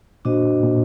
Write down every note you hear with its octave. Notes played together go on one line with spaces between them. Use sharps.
A#2 D4 F#4 C5 D#5
A#2